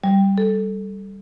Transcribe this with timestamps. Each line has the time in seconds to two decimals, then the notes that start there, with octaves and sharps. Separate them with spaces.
0.04 G3
0.38 A4